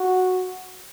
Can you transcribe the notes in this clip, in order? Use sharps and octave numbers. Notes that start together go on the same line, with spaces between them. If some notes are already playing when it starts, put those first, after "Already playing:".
Already playing: F#4